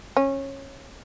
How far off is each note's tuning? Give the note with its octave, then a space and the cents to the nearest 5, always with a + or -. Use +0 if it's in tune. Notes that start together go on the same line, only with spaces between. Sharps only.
C#4 -20